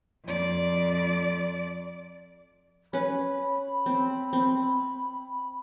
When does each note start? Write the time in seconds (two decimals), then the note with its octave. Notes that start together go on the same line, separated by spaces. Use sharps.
0.25 F2 D5
2.93 C#4 B4 B5
3.86 C4
4.33 C4